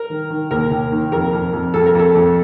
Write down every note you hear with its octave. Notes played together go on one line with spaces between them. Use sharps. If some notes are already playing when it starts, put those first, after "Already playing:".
Already playing: A#4
D#3
D#3
D#2 A#4
D#2
D#3
F2 A#4
F2
F2
F2 A4
A#4
F2 A4
F2